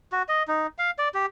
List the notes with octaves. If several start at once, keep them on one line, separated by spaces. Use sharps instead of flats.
F#4
D#5
D#4
F5
D5
G4